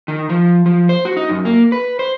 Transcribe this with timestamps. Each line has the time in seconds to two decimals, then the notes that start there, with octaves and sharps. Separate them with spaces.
0.08 D#3
0.29 F3
0.66 F3
0.89 C5
1.05 F#4
1.17 D#4
1.29 F#2
1.45 A#3
1.72 B4
1.99 C5